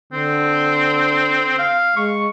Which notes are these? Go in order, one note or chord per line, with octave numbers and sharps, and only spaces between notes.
D3 C4
F5
G#3 C#6